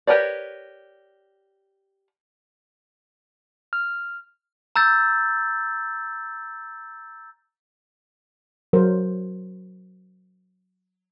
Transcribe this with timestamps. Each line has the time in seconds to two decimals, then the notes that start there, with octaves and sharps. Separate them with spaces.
0.07 G4 A#4 B4 C#5 D5
3.73 F6
4.76 A#5 E6 G6 A6
8.73 F#3 A#4 C5